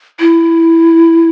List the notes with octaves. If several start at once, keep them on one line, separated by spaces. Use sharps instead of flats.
E4